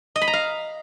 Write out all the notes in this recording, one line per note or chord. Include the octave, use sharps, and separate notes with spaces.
D#5
B5
A#5
F5